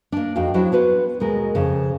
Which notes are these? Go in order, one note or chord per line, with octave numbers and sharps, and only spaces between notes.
A#3 D4
F2 D#4 F#4 F5 G5
F3 F#3 D4 E4 F#4
B3 F#4 B4 C5
D#2 B2 G#3 A#4
F2 C#3